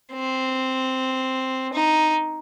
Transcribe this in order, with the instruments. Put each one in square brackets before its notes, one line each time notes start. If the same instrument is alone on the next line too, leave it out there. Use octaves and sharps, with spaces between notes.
[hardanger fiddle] C4
D#4